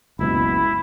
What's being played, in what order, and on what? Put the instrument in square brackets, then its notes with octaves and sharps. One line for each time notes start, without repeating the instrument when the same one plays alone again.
[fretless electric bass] F#1 C#2 B2 [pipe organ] E4